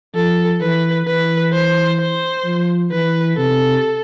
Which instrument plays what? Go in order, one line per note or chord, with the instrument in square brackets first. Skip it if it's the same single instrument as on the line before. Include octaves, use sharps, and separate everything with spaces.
[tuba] F3 [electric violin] A4
[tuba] E3 [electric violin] B4
[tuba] E3 [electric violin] B4
[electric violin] C5
C5
[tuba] F3
[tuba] E3 [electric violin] B4
[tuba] C3 [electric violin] A4